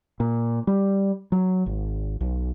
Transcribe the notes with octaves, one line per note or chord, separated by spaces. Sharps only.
A#2
G3
F#3
G#1
B1